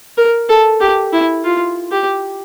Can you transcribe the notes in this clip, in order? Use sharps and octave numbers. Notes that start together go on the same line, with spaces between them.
A#4
A4
G4
E4
F4
G4